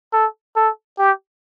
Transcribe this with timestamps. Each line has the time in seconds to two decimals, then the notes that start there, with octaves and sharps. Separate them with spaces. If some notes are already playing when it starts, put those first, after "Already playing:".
0.13 A4
0.56 A4
0.99 G4